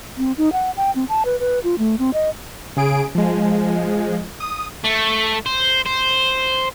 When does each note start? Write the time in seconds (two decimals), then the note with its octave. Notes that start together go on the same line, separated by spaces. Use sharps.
0.18 C4
0.38 D#4
0.53 F#5
0.77 G5
0.95 C4
1.09 A5
1.25 B4
1.40 B4
1.64 F4
1.78 A3
1.99 C4
2.13 D#5
2.77 C#3 G#4 D7
3.15 F3 G#3
4.40 D#6
4.84 A3
5.46 C5
5.86 C5